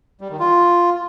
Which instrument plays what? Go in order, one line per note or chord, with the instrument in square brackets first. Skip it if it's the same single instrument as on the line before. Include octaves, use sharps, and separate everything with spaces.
[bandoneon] G3
D#3
F4